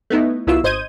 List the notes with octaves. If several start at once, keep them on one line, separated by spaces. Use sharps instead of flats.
A3 B3 D#4 E4
C2 F#3 B3 E4 F4 E6
G#1 C5 D#5 G6 G#6 D#7